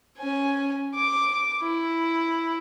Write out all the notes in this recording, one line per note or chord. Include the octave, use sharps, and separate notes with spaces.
C#4 G#5
D6
E4